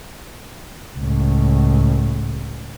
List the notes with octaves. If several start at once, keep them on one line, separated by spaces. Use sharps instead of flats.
C#2 A2